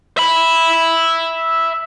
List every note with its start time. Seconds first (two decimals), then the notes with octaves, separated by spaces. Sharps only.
0.18 E5 B5